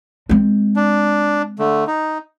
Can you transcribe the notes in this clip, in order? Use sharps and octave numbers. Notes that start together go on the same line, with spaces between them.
G#3 C4
D4
D3 A3
D#4